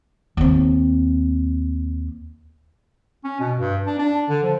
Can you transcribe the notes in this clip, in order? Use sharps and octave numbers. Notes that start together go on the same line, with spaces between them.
D#2 C4
C#4
B2
G2
D4
D4
D3
F3